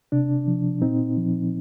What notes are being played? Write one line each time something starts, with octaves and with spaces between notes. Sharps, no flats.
C3 D4
F3
A#2 C4 D#4
F3